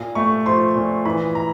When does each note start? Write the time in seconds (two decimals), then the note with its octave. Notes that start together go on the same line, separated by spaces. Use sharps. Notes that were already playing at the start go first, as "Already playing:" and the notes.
Already playing: A#2
0.15 A3 C#6
0.46 F3 C6
0.76 A#2
1.05 E3 B5
1.35 A#5